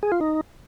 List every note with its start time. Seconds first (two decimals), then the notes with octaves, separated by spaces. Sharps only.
0.03 G#4
0.12 F4
0.21 D#4